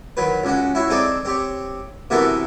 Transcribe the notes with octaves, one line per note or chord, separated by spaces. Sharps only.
D#3 F#3 B4
C#2 C#4 F#4
E4 F#4 C#5
C4 D#4 G#4 A4 D5
C4 G4 C#5
C3 E3 B3 F#4 A4 A#4